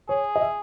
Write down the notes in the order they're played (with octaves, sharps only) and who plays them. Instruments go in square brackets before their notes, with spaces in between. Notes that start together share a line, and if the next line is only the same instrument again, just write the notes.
[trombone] G#4 [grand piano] C#5
[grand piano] D#5
E5